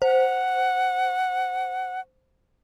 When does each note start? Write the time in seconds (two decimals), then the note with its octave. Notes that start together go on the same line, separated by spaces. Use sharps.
0.02 C5 F#5